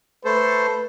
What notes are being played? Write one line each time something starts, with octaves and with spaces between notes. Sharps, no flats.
A3 A4 B4 C5